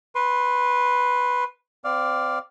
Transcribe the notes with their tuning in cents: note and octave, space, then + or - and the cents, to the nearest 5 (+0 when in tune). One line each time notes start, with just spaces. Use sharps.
B4 +0 C6 +20
C4 -25 D5 +0 F5 +5